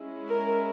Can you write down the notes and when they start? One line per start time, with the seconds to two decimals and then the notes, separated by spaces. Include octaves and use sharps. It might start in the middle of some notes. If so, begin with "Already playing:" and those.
Already playing: G#3 C#4 E4
0.29 A#4